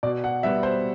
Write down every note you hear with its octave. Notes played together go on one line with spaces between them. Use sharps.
B2 D5
F#5
G3 B3 E5
C5